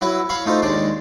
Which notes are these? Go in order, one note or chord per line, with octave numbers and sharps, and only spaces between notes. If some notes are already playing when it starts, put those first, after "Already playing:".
F#3 E4 F#4 B4
C#5 F5 B5 C#6
A3 D#4 F4 C5
D#2 G#3 D4 D5